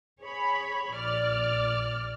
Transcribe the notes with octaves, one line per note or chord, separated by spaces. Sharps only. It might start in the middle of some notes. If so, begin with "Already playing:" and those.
G#4 C#5 B5
A#1 D5 F6